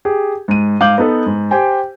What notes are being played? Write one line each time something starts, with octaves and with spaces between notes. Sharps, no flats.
G4 G#4
G#2 D#7
G#2 F5 D6 G6 F#7
B3 D#4 A4 B4
G#2
G4 C5 G5 G#5